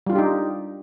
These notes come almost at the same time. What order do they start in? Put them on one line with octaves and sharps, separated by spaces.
G3 F4 D4 G4 D#4